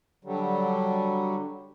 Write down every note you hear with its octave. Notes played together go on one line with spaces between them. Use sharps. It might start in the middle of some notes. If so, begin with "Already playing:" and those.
D3 F#3 G3